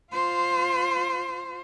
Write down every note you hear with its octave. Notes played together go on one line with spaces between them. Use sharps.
F4 C5